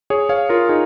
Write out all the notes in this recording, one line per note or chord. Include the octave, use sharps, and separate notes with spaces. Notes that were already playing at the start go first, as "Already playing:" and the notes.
G#4 C#5
C#5 F5
F4 A#4
D#4 G#4